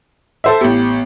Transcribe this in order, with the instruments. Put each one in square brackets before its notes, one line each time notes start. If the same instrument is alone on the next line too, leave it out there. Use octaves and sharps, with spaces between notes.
[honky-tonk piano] A4 C5 E5
[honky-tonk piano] A1 G4 [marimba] B3